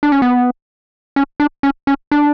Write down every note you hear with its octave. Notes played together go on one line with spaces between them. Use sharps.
D4
C#4
B3
C#4
D4
C#4
C#4
D4